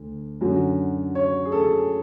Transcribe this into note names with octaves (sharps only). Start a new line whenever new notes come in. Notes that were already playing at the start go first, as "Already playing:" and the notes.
Already playing: D2
F#2 D3 F#3
C#5
G#4
A4